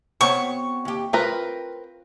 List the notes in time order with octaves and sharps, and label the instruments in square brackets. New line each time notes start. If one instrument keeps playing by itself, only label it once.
[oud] B3 C4 F#4 [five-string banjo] C#5 [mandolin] C#6
[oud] D#2 G4
[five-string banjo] C4 A#4 B4 [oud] F4